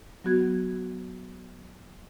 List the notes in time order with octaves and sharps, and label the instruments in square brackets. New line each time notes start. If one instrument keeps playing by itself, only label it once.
[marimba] F#3 B3 F#4 G#6